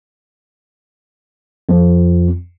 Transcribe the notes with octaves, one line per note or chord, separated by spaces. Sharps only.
F2